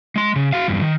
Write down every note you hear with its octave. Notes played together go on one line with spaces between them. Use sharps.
G#3 C6
C#3
F#4 F5
E2 G2
D#3